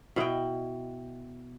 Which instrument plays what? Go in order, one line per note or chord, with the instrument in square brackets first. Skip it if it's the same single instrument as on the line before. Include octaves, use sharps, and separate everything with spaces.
[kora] B2 E4 D#5 G5